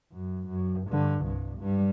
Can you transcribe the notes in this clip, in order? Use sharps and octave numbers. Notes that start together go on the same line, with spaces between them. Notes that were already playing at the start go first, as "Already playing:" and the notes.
F#2
F#2
G2 D3
C2 G2
G2 G3